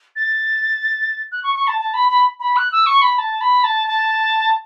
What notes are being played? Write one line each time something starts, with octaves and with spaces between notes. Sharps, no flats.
A6
F#6
C#6
C#6
A5
A5
B5
B5
B5
F#6
E6
C#6
B5
A5
B5
A5
A5